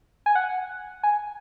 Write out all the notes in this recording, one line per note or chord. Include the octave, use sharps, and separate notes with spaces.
G#5
F#5
G#5